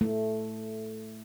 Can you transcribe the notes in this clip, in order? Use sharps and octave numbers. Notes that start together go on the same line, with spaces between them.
A3